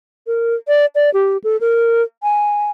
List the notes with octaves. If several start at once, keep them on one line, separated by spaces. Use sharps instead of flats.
A#4
D5
D5
G4
A4
A#4
G#5